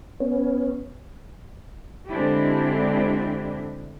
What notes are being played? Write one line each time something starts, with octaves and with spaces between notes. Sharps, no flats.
B3 C#4
D3 G#3 C4 D4 E4 G4